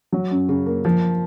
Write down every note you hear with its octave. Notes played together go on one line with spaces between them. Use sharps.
F#3
F#2
C#3
A#3
F3